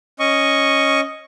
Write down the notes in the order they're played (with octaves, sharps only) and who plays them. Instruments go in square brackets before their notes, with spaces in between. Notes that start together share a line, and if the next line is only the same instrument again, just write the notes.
[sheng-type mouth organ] C#4 D#5 C#6